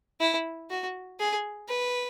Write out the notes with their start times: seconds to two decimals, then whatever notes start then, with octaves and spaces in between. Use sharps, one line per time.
0.20 E4
0.70 F#4
1.20 G#4
1.69 B4